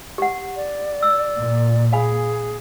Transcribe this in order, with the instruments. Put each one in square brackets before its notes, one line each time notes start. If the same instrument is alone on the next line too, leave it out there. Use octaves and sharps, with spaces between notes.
[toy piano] G4 F#5
[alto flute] D5
[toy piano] E6
[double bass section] A#2
[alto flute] G#4 [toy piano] F5 G#5 B5